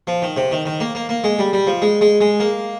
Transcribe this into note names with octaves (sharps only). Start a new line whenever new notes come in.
F3
D#3
C3
D#3
D#3
A#3
A#3
A#3
G#3
G3
G3
F3
G#3
G#3
G#3
A#3